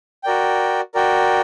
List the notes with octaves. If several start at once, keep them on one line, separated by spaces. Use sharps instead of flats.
F#4 A#4 D5 G5
F#4 A#4 D5 G5